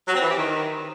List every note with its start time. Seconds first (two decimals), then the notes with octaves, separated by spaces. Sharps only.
0.07 F#3
0.15 C4
0.22 E3
0.29 G4
0.36 D#3